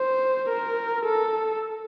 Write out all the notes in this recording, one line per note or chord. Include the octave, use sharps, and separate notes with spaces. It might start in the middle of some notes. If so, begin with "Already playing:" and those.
Already playing: C5
A#4
A4